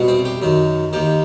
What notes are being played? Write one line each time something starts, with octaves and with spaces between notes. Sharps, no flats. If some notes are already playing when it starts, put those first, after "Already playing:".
Already playing: C2 B2
C4
G4
F#2 D#3
D#2 D#3 G4